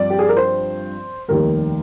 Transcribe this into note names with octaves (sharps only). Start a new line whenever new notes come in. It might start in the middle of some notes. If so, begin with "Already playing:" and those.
Already playing: G2 F3 C4 D5
G4
G#4
A#4
C5
F1 D#2 D#3 G3 A#4